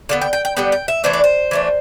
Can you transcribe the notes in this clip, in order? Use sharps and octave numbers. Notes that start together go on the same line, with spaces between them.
D3 G3 B3 F5
G5
G5
G5
D3 G3 B3 G5
G5
E5
E3 A3 D4 C5
D5
C5
E3 A3 D4